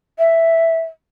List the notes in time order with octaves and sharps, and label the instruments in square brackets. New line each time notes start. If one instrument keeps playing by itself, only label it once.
[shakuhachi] E5